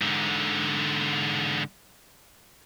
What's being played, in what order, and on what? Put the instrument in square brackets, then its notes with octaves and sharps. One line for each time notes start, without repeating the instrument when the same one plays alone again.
[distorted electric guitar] G#2 D3